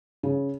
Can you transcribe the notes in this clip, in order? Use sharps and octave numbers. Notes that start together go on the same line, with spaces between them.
C#3